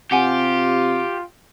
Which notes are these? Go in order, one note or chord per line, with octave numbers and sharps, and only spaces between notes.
C3 F4 G4 F#5 G#5